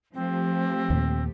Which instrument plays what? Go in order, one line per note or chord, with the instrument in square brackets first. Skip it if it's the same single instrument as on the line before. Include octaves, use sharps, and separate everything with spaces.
[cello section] F3 A3 G4 [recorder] C4
[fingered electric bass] D#2 A#2